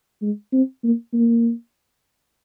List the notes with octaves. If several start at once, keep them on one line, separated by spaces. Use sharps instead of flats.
G#3
C4
A#3
A#3